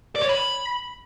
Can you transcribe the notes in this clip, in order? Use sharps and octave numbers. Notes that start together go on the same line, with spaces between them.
D5
C#5
B5